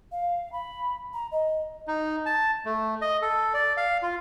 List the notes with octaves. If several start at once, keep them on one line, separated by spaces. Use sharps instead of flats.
F5
B5
A#5
D#5
D#4
A5
A3
D#5
A4
D5
F5
F4